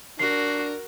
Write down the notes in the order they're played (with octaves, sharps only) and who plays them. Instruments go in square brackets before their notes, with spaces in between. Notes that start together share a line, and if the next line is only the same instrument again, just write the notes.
[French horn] D4 [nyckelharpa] F#4 [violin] A#4 [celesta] C7